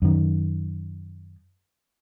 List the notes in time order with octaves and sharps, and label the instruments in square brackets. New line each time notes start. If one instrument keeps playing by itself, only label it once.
[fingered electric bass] F#2 D#3